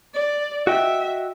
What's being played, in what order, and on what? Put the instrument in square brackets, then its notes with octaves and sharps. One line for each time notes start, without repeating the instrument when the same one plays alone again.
[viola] D5
[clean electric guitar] F#4 D#5 G5 [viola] E5